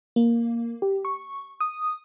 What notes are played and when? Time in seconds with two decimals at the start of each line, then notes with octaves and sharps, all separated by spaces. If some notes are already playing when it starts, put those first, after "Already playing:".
0.16 A#3
0.82 G4
1.05 C#6
1.60 D#6